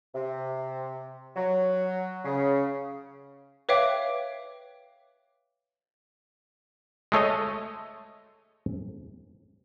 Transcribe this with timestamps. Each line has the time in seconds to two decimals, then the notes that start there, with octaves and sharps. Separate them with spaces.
0.15 C3
1.36 F#3
2.25 C#3
3.69 B4 C#5 E5 F5 G5 D6
7.12 G#3 A3 C#5 D#5